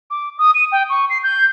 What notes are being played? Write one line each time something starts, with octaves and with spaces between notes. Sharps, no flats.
D6
D#6
D#7
G5
C#6
C7
G6